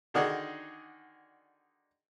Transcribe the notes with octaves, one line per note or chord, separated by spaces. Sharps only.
D3 D#3 D4 D#4 F#4 G#4